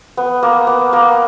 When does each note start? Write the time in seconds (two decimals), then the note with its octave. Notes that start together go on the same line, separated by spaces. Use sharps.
0.17 B3
0.43 A#3
0.67 B3
0.93 A#3